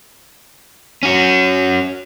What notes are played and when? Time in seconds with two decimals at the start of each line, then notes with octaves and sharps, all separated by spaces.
1.03 C#4 F#4